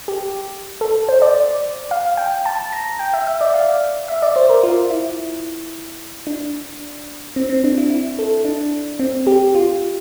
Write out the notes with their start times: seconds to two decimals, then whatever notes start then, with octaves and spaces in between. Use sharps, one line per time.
0.08 G4
0.81 A4
1.09 C5
1.22 D5
1.91 F5
2.17 G5
2.46 A5
2.72 A#5
2.99 G5
3.14 E5
3.27 E5
3.41 D5
3.54 F5
4.08 E5
4.22 D5
4.36 C5
4.50 A#4
4.63 F4
4.90 E4
6.27 D4
7.36 C4
7.49 C4
7.64 D4
7.78 E4
7.90 E4
8.19 A4
8.45 D4
8.99 C4
9.27 G4
9.55 F4